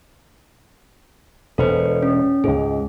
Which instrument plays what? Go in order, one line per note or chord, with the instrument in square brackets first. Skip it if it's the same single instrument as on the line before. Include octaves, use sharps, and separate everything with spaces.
[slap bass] E1 [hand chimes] A4 B4 C5
[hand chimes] C#4
[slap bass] C#2 G#2 [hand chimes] G#4